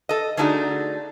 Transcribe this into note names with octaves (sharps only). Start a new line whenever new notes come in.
A4 D#5
D3 A3 D4 D#4 F#4 G#4